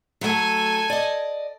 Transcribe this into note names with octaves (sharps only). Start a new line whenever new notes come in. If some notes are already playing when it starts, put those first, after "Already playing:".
F#3 A3 A4 G#5
D5 D#5